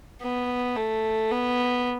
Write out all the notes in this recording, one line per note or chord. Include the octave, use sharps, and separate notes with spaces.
B3
A3
B3